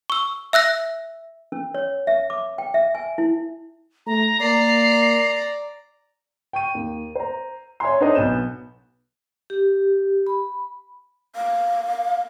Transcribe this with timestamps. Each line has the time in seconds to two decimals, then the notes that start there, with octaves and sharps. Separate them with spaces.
0.10 C#6 E6
0.53 E5 E6 F#6 A#6
1.52 C#4
1.75 C#5
2.07 E5
2.30 D6
2.58 G5
2.74 E5
2.95 G#5
3.18 E4
4.07 A3 A#5
4.40 A#3 D5 A#5 C7
6.53 G5 C#6 D#7
6.75 D#2
7.15 C5 A#5
7.80 C#5 E5 G#5 C6
8.00 D4 D#4 A4 C5 C#5 D#5
8.15 B1 B3 G6 E7
9.50 G4
10.27 B5
11.36 F5